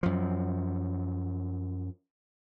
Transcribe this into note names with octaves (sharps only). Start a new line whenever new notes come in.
F#2 F3